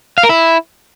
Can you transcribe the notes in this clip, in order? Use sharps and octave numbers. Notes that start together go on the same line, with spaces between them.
F5
A#4
E4